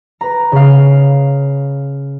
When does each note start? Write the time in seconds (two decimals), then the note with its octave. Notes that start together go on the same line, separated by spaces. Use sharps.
0.21 B4 A#5
0.52 C#3 F5